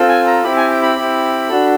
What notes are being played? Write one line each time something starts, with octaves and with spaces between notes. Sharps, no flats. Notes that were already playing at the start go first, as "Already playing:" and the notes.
Already playing: C4 F4 A4
G#5
A#5
C4 E4 G4 B5
G#5
G5
B5
C4 E4 G4
D4 F#4 A4